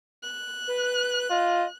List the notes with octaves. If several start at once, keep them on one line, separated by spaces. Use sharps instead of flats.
F#6
B4
F4 D#5